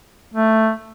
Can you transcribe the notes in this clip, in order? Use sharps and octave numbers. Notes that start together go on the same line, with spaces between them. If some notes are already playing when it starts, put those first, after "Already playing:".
A3